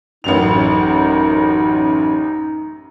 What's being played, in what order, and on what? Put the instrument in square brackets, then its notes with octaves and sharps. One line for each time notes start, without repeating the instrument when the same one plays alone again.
[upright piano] A1 F#2 F7 [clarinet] D#4